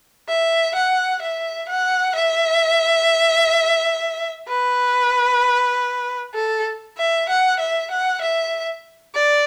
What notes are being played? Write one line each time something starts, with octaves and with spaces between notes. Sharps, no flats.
E5
F#5
E5
F#5
E5
B4
A4
E5
F#5
E5
F#5
E5
D5